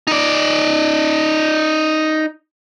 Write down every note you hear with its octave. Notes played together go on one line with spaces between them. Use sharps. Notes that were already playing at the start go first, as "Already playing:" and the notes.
D#4 D5